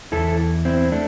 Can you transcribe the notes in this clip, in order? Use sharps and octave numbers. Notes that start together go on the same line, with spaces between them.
E2 E3 E4 A4
C4 E4
A3 D4